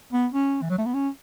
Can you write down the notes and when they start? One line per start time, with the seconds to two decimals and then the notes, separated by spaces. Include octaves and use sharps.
0.13 B3
0.33 C#4
0.62 E3
0.70 F#3
0.78 A3
0.86 B3
0.94 C#4